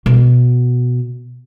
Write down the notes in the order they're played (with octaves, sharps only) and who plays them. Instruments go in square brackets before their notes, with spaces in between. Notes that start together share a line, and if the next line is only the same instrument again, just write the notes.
[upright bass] B2